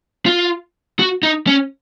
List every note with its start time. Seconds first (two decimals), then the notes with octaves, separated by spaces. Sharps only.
0.26 F4
0.99 F#4
1.23 D#4
1.47 C#4